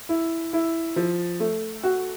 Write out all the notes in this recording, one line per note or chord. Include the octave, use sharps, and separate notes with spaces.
E4
E4
F3
A3
F#4